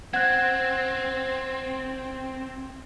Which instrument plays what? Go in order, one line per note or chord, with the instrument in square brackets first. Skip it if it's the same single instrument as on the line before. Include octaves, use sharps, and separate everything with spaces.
[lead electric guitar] C4 [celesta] F#5 F#6 [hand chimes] G#6